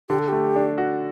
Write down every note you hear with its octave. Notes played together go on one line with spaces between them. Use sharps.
D3 G4
A4
A3 G4
D4
F#4